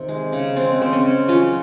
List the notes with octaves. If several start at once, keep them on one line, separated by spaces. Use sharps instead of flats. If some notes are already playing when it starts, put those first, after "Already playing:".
Already playing: C3 D#3
G#3
C#3
G#3 C4
C#3 C4
C#4
C#3
F#3 C#4 F4